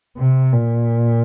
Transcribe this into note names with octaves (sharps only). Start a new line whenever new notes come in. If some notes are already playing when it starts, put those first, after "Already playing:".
C3
A#2